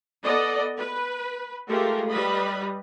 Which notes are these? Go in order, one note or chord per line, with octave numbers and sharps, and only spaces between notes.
B3 A4 D5 D#5
B4
G#3 A3 F4 G4 A4 A#4
G3 B4 D#5 B5